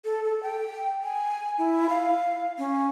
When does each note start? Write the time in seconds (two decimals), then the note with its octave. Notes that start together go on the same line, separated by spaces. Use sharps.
0.05 A4
0.24 A4
0.43 G5
1.03 G#5
1.58 E4
1.89 F5
2.58 C#4